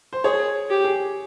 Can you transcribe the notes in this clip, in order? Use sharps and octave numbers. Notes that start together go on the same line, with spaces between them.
C5
G#4 C#5
G4
G#4